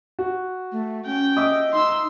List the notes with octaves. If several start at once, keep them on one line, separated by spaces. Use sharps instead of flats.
F#4
A3
C#4 G5
D#5 E5 D6
D#4 C6 E6